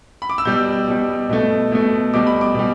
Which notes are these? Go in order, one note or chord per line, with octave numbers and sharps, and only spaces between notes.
B5
D6
E6
B2 G3 G6
B2 G3
B2 A3
B2 A3
B2 G3 D6
B5
D6
B2 G3